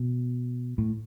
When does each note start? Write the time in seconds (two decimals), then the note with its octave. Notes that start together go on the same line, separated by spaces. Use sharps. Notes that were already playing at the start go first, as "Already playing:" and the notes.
Already playing: B2
0.78 A2